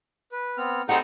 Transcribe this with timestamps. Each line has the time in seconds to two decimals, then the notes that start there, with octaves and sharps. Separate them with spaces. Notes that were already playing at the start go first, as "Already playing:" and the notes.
0.32 B4
0.57 B3 C4 F6
0.89 G3 A3 C4 D#4 G#4 F#5